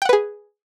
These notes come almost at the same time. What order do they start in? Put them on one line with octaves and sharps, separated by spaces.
G5 F#5 B4 G#4